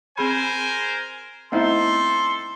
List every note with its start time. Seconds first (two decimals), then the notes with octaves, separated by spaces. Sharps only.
0.18 C4 G#4 A#4 C5 G#5 B5
1.52 A3 B3 C4 D#4 E4 A4 E5 C6